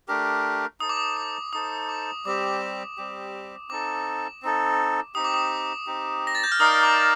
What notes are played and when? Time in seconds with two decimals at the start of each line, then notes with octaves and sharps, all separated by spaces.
0.08 A3 D4 G4 A#4
0.80 D#4 A4 C5 D#6
0.89 D6
0.97 D#6
1.17 D6
1.53 D#4 A4 C5 D#6
1.89 D6
2.25 G3 C4 G4 D6
2.44 D6
2.98 G3 C4 G4
3.70 C4 D#4 A4 D6
4.42 C4 D#4 A4
5.15 C4 D#4 G4 D#6
5.24 D6
5.34 D#6
5.87 C4 D#4 G4
6.27 A#6
6.35 A6
6.44 G6
6.52 F6
6.59 D#4 A#4 D5 F5 D#6
6.83 D6